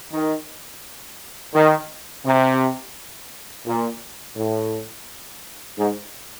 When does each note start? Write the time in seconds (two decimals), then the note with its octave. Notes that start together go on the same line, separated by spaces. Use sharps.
0.12 D#3
1.54 D#3
2.25 C3
3.66 A#2
4.36 A2
5.77 G#2